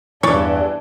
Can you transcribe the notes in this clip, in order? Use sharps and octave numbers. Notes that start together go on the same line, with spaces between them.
E2 G2 E3 D4 C#5 D5